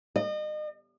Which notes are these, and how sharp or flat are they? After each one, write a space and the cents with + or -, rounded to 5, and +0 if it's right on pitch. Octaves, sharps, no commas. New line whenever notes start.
D#5 -35